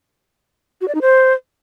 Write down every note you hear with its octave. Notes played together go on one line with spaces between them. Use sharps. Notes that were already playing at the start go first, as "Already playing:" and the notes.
F#4
D5
D#4
C5